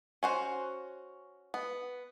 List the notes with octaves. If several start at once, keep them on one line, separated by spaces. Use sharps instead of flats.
C#4 F#4 C5
B3